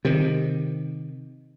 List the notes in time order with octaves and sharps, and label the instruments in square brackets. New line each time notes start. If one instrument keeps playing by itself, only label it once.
[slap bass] C3 D#3